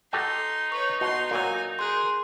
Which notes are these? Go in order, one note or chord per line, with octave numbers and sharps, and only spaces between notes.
D#4 F#4 G4 A4 C6
B4 C#5 C#6
B2 F#4 F#5 C6
A#2 F#3 G#5
G#4 A#4 C6 F#6